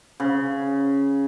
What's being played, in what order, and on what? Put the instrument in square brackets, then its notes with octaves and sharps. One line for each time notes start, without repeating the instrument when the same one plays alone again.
[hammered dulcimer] C#3